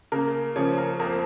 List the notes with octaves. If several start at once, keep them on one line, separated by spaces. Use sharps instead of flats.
C#3 A#3 A#4
C#3 F3 A#3 C#5
A#4
F2 F3 A#3 A#4